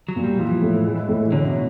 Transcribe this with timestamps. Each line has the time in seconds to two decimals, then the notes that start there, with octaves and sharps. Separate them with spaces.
0.08 F#3
0.16 A#2
0.24 G3
0.39 E3 F3
0.62 A2
0.86 G#3
1.09 A2
1.32 F#2 D3
1.48 B2